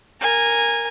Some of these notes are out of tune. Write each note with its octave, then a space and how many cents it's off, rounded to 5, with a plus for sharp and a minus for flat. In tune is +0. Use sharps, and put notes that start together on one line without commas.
A#4 +0 G#5 -15